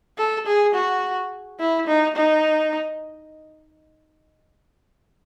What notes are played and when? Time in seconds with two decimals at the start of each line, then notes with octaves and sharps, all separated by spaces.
0.18 A4
0.47 G#4
0.75 F#4
1.60 E4
1.87 D#4
2.16 D#4